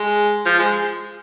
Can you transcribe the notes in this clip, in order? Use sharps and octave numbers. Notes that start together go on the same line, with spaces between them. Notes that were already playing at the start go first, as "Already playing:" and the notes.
Already playing: G#3
F3
G#3